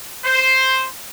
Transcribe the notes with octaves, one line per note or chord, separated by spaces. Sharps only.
C5